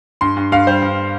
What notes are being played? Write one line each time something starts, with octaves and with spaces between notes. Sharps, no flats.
G2 C6
G2
G2 F5
G3 C5
G2